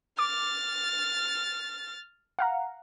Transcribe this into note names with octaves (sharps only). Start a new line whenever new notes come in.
D6 F6 A6
F5 F#5 A#5